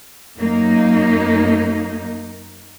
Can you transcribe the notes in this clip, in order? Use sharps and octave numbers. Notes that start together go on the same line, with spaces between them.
F#2 A#3 D#4